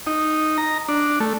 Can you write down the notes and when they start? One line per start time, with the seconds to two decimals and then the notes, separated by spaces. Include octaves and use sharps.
0.07 D#4
0.58 A#5
0.89 D4
1.20 A3